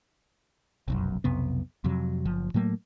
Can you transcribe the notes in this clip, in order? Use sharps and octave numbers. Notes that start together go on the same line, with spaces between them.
F1 B1 F#2
B1 F2 C3 B3
F2 C3 F#3
F#1 F3
A2 F#3 A3 A#3